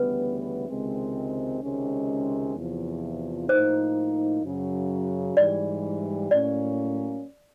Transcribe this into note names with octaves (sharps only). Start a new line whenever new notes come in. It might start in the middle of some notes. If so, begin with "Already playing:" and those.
Already playing: D2 C#3 E3 G3 B3 B4
C#2 C3 D#3 G#3 C4
C#2 C3 D#3 G#3 C#4
E2 C3 F3
A2 F3 A#3 D#4 C5
F#2 C#3 F#3
G#2 E3 G3 D5
A2 F#3 A#3 C#4 D5